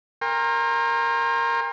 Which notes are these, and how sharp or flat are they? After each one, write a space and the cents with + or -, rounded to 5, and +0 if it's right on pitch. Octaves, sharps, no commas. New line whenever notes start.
A#4 +0 G5 +45 C6 +30